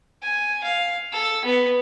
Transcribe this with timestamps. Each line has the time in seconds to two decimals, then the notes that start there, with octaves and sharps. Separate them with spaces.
0.23 G#5
0.64 F5
1.12 A4
1.45 B3